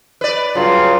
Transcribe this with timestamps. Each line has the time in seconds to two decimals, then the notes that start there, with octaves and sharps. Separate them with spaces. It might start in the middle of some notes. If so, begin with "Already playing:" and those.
0.21 B4 D5
0.55 G2 C#3 F#3 F4